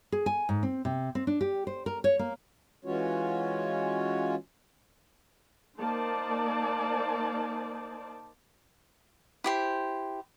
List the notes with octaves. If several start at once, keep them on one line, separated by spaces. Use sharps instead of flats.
G#4
G#5
G#2
C4
C3
C4
D4
G4
C5
A#4
C#5
A#3
E3 G#3 C#4 F4 F#4 C#5
A#3 D#4 C5 D5 A5
E4 G4 C5